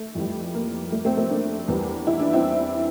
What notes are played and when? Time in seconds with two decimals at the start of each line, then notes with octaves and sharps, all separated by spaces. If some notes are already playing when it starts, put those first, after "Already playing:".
Already playing: A3
0.15 F2 E3 G3
0.54 A#3
0.92 A3
1.05 A3 C4
1.17 A3 C4
1.30 A#3 D4
1.68 E2 E3 G3
2.07 E4
2.20 D4
2.33 C4 E4